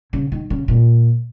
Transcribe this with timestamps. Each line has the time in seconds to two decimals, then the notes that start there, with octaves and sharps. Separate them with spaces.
0.13 C#3
0.32 D#3
0.50 C#3
0.68 A#2